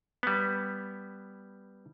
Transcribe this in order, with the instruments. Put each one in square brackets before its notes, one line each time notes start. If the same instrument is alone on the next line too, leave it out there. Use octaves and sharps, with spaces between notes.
[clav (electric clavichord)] G3 B3